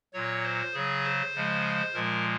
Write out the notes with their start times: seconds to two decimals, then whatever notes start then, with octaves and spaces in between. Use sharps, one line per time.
0.13 A#2 F#3 C#5
0.44 C5
0.74 C#3 F#3 G#4
1.04 C5
1.34 C#3 F3 G#3
1.94 A#2 F3 G#3 A#4